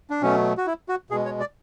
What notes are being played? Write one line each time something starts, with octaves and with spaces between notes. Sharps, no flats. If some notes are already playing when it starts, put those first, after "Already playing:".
D4
B2 F#3 A3 C#4
F#4
E4
F#4
B2 G#3 G#4
C#5
D5